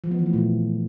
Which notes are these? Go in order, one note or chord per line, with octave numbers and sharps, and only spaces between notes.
F3
B3
E3
A3
A#2